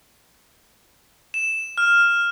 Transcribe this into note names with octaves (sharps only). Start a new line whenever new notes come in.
E7
F6